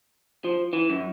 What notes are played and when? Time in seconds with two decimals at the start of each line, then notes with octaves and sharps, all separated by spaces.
0.44 F3
0.73 E3
0.90 F#2